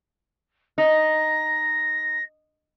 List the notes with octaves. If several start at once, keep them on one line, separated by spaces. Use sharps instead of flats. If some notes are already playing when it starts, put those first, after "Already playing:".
D#4 A#6